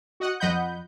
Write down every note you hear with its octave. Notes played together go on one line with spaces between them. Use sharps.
F#4 D#5 F#5
F2 F3 D#5 F#5 B5 G6